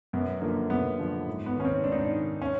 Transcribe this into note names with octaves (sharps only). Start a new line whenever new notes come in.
F#2 B3
D3 F3 A#3
F#2 B3
D3 F3
G#2
B3
D#3 C#4
C4
G#2 D4
D#4
D4
D#3
C#4